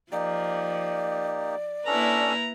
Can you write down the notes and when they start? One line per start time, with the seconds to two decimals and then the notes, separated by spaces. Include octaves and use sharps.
0.12 F3 A#3 D#4 G4 D5
1.86 A#3 C#4 D4 E4 A4 B4 A#5